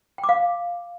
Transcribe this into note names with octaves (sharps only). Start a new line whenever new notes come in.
G5
D6
F5